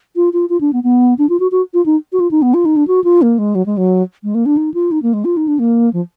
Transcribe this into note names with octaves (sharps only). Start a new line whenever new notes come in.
F4
F4
F4
D4
B3
B3
D4
F4
F#4
F#4
F4
D#4
F#4
F4
D#4
B3
F4
D#4
D4
F#4
F4
A#3
G#3
F#3
G#3
F#3
G#3
A#3
D4
D#4
F4
D#4
A#3
G#3
F4
D#4
D4
A#3
F3